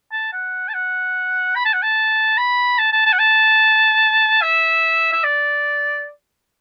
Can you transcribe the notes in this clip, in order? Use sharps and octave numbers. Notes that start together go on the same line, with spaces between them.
A5
F#5
A5
F#5
B5
A5
F#5
A5
B5
A5
A5
A5
F#5
A5
E5
E5
D5